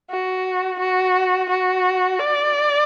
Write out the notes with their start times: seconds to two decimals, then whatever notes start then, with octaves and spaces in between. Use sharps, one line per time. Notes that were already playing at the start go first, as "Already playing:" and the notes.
0.10 F#4
0.80 F#4
1.50 F#4
2.19 D5